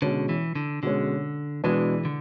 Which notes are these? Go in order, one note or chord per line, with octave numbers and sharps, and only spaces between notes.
B2 D3 G#3 C#4
E3
D3
B2 D3 G#3 C#4
B2 E3 G#3 D4 G#4 B4
D3